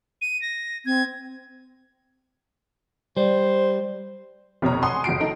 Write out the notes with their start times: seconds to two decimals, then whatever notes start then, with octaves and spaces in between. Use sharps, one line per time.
0.21 D#7
0.42 A#6
0.86 C4 G#6
3.17 G3 C5
4.62 F1 B2 C#5 A#5
4.82 F#5 G#5 C6 D#6
5.04 F#1 F#4 C7 D7
5.20 D#4 A4